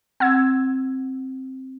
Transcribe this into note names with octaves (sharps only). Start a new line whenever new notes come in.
C4 F#5 E6 G#6